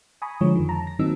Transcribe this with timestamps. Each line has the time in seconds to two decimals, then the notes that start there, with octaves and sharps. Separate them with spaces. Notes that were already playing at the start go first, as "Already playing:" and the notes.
0.22 G#5 A#5 B5 C#6 D#6
0.41 D3 F3 G#3 C#5
0.55 F2 D#3
0.69 A5 A#5
0.87 A#6
0.99 A#2 D#3 F#3 C4 D#4 E6